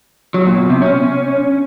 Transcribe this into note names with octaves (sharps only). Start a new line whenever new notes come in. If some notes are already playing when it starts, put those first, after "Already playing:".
F#3
A#2
B2
C3
C#4